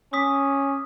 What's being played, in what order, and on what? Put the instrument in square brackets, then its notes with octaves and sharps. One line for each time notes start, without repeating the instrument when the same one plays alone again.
[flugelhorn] C#4 [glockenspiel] D6 D#6 B6